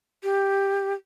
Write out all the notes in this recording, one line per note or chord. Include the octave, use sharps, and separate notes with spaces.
G4